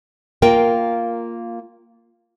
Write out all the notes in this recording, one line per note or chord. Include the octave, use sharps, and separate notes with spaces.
A#3 F4 A#4 G5